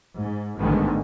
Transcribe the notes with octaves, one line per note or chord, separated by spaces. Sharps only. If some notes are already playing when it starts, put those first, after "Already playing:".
G#2
A1 G#2 D3 D#3 G#3 B3